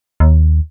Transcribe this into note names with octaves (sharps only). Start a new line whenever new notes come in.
D#2